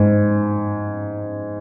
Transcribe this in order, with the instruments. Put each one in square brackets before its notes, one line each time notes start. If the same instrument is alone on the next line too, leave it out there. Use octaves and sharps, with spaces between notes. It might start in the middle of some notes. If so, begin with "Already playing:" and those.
Already playing: [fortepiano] G#2